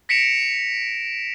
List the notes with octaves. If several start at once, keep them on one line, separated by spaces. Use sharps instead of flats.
A#6 B6 C#7 D7 E7 F7